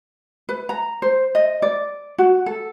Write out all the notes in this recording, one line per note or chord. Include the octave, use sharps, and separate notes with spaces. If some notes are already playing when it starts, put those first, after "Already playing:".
B4
A#5
C5
D#5
D5
F#4
A4